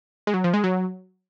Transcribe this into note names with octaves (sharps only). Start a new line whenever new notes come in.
G#3
F#3
F3
G#3
F#3